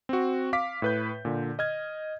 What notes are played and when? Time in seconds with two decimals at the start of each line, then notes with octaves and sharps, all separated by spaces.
0.09 C4 F#4
0.53 F5 D6 B6
0.82 A2 B4 G6
1.25 A#2 D3
1.59 D#5 F6 G#6